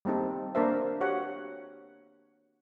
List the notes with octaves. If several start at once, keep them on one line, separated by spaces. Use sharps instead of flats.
G3 A#3 C4 D#4 A4
A#3 D4 A4 A#4 C5 E5
F#4 G4 C#5 F#5